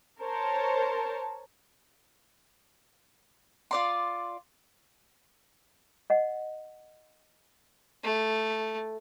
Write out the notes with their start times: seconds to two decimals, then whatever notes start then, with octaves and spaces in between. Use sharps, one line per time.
0.23 A#4 C5 C#5 A5
3.71 F4 D5 C6
6.10 D#5 F#5
8.04 A3